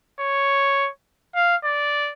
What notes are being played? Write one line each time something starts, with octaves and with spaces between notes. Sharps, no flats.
C#5
F5
D5